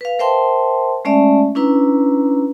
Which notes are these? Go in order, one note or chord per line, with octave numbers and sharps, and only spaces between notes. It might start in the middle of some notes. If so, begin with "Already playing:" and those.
B4 F5
A#4 C5 E5 G5 A5 C6
G#3 A3 C#4 D5 E5 A5
C#4 D4 E4 B4 A#5